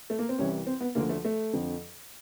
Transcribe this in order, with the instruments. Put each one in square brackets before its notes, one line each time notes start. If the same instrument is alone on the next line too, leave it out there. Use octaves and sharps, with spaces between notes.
[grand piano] A3
A#3
C4
C2 C3 E3 C#4
C4
B3
D2 D3 F3 A#3
A3
A3
F2 D3 F3